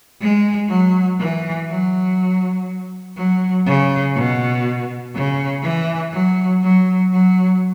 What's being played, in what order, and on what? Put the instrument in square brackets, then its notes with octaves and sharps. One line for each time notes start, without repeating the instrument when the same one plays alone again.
[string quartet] G#3
F#3
E3
F#3
F#3
C#3
B2
C#3
E3
F#3
F#3
F#3